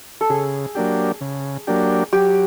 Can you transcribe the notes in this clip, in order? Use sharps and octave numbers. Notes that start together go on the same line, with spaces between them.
A4
C#3 G#4
F#3 A#3 D4 G4
C#3
F#3 A#3 D4 G4
F#3 G4